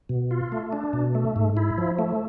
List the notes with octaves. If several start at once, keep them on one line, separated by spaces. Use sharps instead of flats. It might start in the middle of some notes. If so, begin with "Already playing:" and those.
B2
F4
A3
D4
B2
A3
G#2
E4
F3
A3